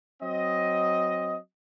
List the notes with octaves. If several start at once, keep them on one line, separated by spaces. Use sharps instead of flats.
F#3 C4 D#5